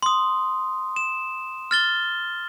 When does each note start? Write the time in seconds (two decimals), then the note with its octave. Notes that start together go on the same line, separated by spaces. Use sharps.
0.03 C6 D#6
0.96 E7
1.71 F6 A6 G7